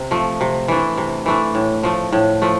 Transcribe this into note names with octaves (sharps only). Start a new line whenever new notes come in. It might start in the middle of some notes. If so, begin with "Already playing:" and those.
Already playing: C3
F3 A3
C3
E3 A3 D4
C3
E3 A3 D4
A2
F3 A3
A2
F3 A3